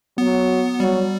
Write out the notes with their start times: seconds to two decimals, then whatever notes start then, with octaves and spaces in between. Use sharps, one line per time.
0.18 F#3 B3
0.80 F#3 G3